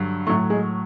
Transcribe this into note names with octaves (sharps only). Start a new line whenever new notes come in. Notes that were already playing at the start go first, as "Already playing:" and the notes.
Already playing: G2 D3 F#3
A2 F#3 A3
G#3